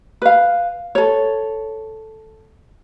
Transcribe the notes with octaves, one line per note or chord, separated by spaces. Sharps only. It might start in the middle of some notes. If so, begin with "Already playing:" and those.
B4 F5
A4 C#5